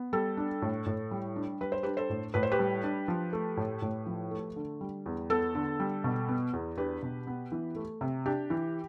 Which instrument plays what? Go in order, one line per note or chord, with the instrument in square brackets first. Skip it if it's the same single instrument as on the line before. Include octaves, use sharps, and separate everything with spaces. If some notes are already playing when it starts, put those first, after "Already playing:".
Already playing: [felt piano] B3
G3 A4
D4
A2
A2
G3
D4
G3 B4
C5
D4 G4 B4
A4 C5
A2
A2 B4
C5
G4 B4
G3
D4
F3
A3
A2
A2
F3
A3
D3
G3
E2
B3 A4
D3
G3
B2
B3
E2
D4 G4 B4
B2
B3
E3
A3
C3
D4 G4
E3